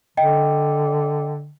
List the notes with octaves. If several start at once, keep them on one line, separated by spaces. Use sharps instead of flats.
D3 D#5 G5